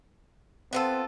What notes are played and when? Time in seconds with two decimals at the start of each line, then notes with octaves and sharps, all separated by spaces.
0.73 B3 C4 F4 A4